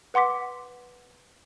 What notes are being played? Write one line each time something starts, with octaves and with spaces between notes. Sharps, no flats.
B4 F#5 C6 D6 B6